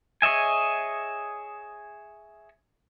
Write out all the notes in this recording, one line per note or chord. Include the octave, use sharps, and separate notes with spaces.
G#4 C#5 D#5 E5 G#5